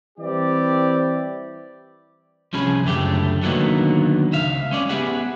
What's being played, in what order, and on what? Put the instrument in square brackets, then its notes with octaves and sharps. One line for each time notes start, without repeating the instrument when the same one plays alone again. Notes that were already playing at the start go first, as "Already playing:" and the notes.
[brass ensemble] E3 G3 C4 E4 G4 D5
[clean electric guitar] C2 F3 C#4 G#4 B5
C#2 F#2 D3 A3 G4
D3 D#3 F#3 A#3 B3 D#4
C#2 E5 F5
G#3 C#4 D5
B3 G4 G#4 E5 F#5